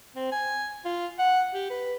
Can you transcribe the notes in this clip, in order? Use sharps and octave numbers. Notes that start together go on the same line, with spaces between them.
C4
G#5
F4
F#5
G4
B4